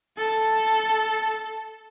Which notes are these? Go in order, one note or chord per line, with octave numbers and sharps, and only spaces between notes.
A4 A5